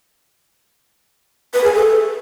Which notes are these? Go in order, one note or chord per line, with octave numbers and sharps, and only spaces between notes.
B4
G#4
A4